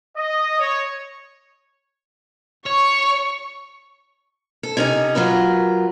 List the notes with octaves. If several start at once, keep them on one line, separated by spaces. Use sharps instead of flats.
D#5
C#5
C#5 C#6
A4
C3 C#4 D#4
F#3 F4 A#4 B4